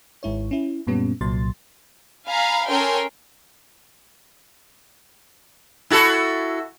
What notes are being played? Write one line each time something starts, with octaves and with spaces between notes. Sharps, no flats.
G#1 G#2 E4 C#5
C#4 E4
F#2 A#2 G3 B3 C#4
C2 A#2 F#3 C6 A6
F5 G#5 A#5 B5
C#4 A4 A#4 G5 G#5 C6
E4 F#4 A4